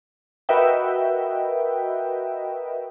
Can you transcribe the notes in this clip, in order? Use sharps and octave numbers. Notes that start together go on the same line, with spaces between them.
F#4 A#4 B4 D#5 E5 G5